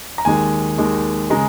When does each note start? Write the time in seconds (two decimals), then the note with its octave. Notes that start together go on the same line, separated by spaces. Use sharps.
0.18 A#5
0.25 D#2 D#3 G#3 G#5
0.78 D#2 D#3 G#3
1.30 C#3 G#3 A#5